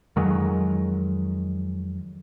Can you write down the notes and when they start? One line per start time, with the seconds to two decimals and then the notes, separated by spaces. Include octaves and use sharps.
0.16 F2 D#3 F#3 G#3